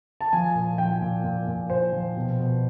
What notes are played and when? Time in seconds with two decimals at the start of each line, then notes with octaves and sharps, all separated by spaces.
0.21 A5
0.33 F3 G#5
0.55 A#2
0.78 F3 G5
1.01 A#2
1.24 A#2
1.47 A#2
1.70 A#2 C5
1.92 F3
2.17 B2
2.39 B2